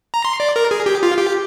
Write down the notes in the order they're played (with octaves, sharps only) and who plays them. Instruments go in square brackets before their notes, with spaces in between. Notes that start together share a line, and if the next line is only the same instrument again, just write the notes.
[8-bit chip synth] A#5
C6
D5
A#4
G#4
G4
F4
G4